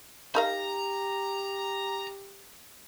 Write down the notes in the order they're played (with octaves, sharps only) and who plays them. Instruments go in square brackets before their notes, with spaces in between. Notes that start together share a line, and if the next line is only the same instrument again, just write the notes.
[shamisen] D#4 A#4 F5 [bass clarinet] G4 [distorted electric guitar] A#5 B5